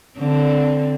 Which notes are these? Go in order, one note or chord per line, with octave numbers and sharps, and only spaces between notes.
D3 C4